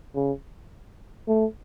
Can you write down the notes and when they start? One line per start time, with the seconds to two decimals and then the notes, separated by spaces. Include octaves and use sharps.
0.15 C#3
1.28 A3